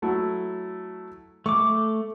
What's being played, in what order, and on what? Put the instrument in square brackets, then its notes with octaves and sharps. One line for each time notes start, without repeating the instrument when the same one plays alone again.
[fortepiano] F#3 A3 E4
[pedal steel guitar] A3 D6 [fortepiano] C#6